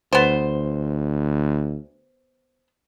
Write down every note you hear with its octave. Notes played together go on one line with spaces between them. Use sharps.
D2 B3 C5